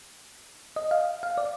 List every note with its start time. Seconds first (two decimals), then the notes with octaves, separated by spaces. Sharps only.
0.76 D#5
0.91 F5
1.23 F5
1.38 D5